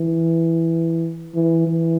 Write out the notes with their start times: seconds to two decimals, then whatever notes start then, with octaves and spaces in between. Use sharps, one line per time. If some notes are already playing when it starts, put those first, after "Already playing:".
Already playing: E3
1.35 E3
1.67 E3